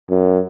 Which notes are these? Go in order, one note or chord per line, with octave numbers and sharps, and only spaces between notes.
F#2